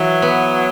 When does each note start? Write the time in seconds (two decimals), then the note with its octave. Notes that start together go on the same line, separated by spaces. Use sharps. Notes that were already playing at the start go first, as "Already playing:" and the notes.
Already playing: E3 F#3
0.22 B3